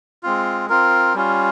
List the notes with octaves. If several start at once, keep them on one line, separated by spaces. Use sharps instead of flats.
G#3 C4 F4
C4 F4 A#4
G3 C#4 F4